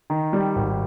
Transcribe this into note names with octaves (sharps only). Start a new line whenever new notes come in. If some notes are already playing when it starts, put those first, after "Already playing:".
D#3
G3
G#1